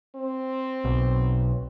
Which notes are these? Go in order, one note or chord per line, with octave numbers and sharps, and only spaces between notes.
C4
B1